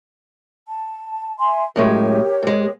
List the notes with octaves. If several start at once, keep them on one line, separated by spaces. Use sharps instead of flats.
A5
E5 G#5 C6
F#2 A2 G#3 G4 A#4 C#5
G#2 G#3